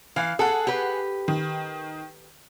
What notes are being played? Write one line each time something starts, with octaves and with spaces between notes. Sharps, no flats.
E3 F5
G#4 A4 F#5
G4 B4
D#3